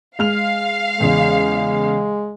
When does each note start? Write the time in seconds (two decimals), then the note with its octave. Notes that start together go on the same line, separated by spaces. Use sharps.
0.19 G#3 F5 F6 F7
1.00 E2 C#3 G#3